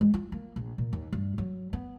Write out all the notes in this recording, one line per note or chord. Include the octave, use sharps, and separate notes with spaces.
G#3
F4
A#3
A#1
A#2
D#2
G2
F#3
B3